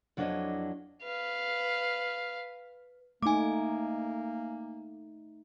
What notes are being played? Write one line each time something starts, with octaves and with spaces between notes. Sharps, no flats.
F2 F#3 D4 E4 C#5 D#5
B4 F5
A3 A#3 D#4 G#5 D6